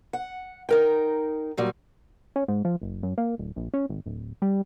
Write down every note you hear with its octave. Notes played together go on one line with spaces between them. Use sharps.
F#5
D#4 A#4 G5
A#2 F#3 G3
C#4
G#2
F3
F#1
F#2
A#3
D1
A#1
C#4
G#1
D1
G3